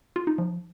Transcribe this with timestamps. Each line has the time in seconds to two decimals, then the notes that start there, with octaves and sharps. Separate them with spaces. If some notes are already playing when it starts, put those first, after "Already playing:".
0.16 F4
0.27 D#4
0.38 F3